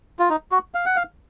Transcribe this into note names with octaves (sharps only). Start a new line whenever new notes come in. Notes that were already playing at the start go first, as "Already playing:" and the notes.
F4
D#4
F#4
F5
F#5
F5